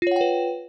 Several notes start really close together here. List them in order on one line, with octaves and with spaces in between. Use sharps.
F4 C#5 F#5 G5 B4